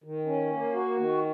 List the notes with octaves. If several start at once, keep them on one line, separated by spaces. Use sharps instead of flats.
D#3
C#4
A#3
F#4
D#3